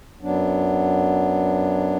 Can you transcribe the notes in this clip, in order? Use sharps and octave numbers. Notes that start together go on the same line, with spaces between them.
F#2 F#3 B3 D4